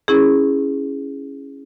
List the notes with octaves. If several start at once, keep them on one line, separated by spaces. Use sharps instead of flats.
C#4 E4 G#4